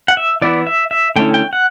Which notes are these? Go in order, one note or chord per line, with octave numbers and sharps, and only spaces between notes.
F#5
E5
E3 B3 E4 D5
E5
E5
D3 A3 C#4 E4 G5
G5
F#5